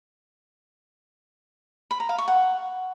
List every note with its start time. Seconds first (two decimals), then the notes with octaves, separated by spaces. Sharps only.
1.91 B5
2.00 A#5
2.09 F5
2.18 C#6
2.28 F#5